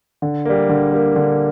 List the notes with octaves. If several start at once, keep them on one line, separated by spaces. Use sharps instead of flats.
D3
G3 A#3
D3
G3 A#3
D3